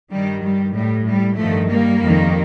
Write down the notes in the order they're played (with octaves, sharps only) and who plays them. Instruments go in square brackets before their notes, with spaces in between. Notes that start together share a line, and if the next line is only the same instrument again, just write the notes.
[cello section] G2 D#3 G3
G3
A2 G3
G3
G2 D#3 F3 A3
G3 A#3
F2 D#3